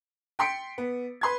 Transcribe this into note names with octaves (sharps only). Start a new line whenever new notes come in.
G5 C6 B6 C#7 D7
B3
B4 C6 G#6